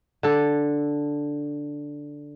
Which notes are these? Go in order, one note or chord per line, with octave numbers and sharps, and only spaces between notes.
D3 A4